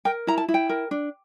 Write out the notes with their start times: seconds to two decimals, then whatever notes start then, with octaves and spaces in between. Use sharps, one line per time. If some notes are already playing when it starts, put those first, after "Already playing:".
0.05 A#4 G5
0.27 E4 A#5
0.38 A5
0.48 E4
0.54 G5
0.69 A#4
0.91 D4